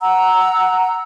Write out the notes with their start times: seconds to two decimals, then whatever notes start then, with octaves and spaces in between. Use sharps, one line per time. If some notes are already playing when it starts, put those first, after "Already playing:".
0.01 F#5 A#5 E6